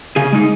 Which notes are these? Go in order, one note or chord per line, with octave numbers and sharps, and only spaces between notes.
C#3 G#4
G#3 D#4